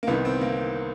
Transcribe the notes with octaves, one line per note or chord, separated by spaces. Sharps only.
A#3
C2 C3 D#3 B3
C4
A#3